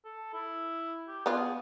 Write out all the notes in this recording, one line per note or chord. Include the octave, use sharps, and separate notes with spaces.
A4
E4
G4
B3 F4 G#4